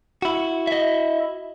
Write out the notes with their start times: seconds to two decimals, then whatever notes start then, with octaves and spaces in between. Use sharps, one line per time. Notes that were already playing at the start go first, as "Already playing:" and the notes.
0.22 E4 F#4
0.67 D#5 E5